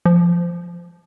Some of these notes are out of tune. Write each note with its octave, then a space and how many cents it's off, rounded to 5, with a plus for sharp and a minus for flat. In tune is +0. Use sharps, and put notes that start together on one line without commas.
F3 -10